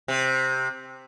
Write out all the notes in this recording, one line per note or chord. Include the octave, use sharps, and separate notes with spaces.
C3